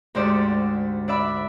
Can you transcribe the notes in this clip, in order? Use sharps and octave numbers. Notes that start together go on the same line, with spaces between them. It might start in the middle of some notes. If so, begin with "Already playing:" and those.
D2 G#2 D3 G4 C5 D5
D4 D5 E5 B5